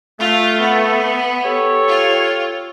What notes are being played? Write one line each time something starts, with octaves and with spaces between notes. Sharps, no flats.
A3 F4
B3
G4 A4 C#5
F4